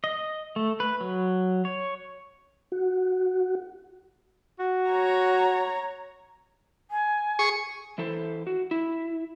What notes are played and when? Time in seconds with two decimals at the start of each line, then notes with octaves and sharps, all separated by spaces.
0.04 D#5
0.56 A3
0.80 B4
1.01 F#3
1.65 C#5
2.72 F#4
4.59 F#4
4.90 C#5 A#5
6.91 G#5
7.39 G#4 C#6
7.98 E3 E4 A4 C5
8.47 F#4
8.71 E4